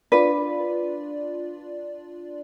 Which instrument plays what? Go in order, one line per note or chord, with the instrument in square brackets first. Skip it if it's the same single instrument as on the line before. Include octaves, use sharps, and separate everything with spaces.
[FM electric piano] D4 F4 D5 [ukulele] B4